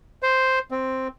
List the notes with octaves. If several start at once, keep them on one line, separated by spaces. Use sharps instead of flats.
C5
C4